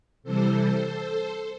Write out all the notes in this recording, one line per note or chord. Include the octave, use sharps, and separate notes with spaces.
C3 E3 G3 A4 C5